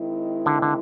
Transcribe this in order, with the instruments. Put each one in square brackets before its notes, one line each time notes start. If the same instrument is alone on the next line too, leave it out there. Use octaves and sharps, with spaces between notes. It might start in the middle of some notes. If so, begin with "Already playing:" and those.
Already playing: [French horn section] D#3 G#3 C4 E4
[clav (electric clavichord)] D3
D3